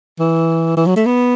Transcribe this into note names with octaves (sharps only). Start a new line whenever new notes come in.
E3
E3
F#3
A3
B3